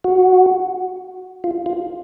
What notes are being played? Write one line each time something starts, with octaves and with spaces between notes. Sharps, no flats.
F#4
F4
F4